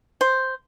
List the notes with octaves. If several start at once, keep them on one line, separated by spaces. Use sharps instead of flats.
C5